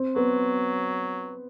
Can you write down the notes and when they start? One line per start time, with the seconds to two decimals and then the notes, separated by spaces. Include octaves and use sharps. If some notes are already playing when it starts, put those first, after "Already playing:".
Already playing: C4
0.16 F#3 B3